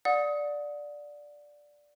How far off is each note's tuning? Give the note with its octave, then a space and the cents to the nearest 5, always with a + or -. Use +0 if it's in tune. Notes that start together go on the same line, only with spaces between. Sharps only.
D5 +0 F#5 -30 D#6 +20